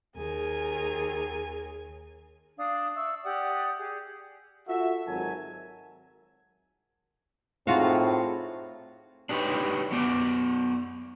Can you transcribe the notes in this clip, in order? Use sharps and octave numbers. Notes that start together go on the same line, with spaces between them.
D#2 G#4 A#4 G#5
D4 F5 D#6
E5 C#6 E6
G4 D5 F#5 D#6
G4 G#4
F4 F#4 A4 E5
G#1 F#3 A#4 G#5 A5
A2 C4 D#4 F4 F#4 G#4 D#5 F5
D4 D#4 G4 A4 B4 C#5
F#3 B3 D5